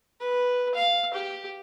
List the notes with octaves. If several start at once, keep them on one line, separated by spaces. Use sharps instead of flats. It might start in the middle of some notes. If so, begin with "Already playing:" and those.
B4
F5
G4